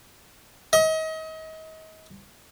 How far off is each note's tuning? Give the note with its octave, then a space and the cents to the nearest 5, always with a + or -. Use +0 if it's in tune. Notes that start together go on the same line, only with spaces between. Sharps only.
D#5 +35